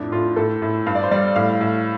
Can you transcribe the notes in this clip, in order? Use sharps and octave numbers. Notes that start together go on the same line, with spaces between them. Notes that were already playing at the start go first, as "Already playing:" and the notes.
Already playing: F2 A2 D4
A2 F4
A2 A4
A2
G2 F5
D5
C5
G3 D5
A2 F5
A2